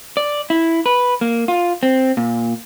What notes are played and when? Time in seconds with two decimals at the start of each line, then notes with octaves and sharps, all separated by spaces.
0.17 D5
0.50 E4
0.86 B4
1.21 A#3
1.48 F4
1.83 C4
2.17 A#2